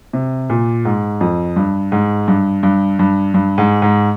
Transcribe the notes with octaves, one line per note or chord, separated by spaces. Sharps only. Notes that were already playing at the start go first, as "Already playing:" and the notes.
C3
A#2
G#2
F2
G2
G#2
G2
G2
G2
G2
G#2
G#2